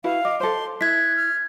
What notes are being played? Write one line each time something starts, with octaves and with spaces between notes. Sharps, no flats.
E4 F#4 B4 F5
D#5 D6
A4 C5 C6
E4 F#6 G#6 B6
F6